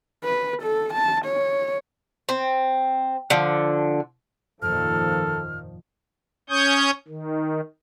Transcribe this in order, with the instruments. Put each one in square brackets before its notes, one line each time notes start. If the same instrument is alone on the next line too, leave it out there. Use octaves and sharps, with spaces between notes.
[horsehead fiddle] B4
A4
A5
C#5
[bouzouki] C4
D3 F3
[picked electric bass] G1 F2 [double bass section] A#2 D#3 F3 [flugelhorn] A4 [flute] F6
[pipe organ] C#4 C#5 C#6 D#6 G6
D#3